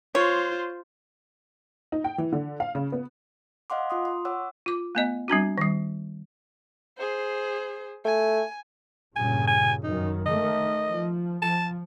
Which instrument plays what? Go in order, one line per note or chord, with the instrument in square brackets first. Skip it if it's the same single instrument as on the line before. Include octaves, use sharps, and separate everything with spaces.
[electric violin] F4 C5 [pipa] C#5
[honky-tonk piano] D#4
G5
E3
D3
F5
C#3
B3
[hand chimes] D#5 F5 F#5 C6 D6
F4 C6 D#6
C6
C#5 F#5 D6 E6
[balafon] F4 D6
A3 B3 D#5
G3 C4 D4 F#4
D#3 G3
[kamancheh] G#4 C5
[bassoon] A3 [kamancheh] G#5
[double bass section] G2 A#2 C#3 [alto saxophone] G#5
[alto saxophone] G#5
[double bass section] F#2 D#3 [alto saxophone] D#4
[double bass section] D#3 A3 [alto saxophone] D#5
[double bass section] F3
[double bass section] F3 [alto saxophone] A5